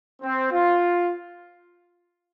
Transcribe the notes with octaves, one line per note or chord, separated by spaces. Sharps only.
C4
F4